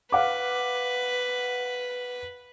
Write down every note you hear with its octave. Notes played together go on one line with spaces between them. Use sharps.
B4 F5 F#5 D6